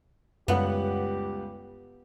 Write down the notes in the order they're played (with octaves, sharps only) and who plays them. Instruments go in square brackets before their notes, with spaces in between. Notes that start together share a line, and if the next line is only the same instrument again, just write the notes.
[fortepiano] C#2 G3 F#5 [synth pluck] F#2 [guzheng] B3 [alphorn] G4